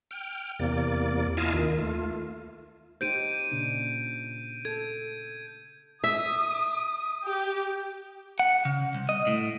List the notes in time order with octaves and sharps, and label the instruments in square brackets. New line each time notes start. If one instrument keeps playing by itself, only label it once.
[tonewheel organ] G5 F6
E2 C3 A#3 D5
E4 F4 D#5 F5 G#5 A5
D#2 D#3
A3 F4
[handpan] D#4 G4 C5 [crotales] G6 D7 D#7
[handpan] A#2 C#3 D4
[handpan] A4 [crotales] G#6
[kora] E5 [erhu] D#6
[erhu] G4
[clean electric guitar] F#5
C#3
C2
D#5
A2